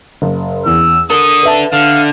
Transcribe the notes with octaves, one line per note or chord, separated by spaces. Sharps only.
F#1
E2 E6
D4 A4 A#4 D#6
B4 E5 A5
D3 F5